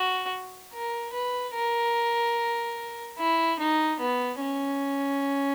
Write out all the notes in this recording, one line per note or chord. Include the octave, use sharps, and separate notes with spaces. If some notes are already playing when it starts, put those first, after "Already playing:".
Already playing: F#4
A#4
B4
A#4
E4
D#4
B3
C#4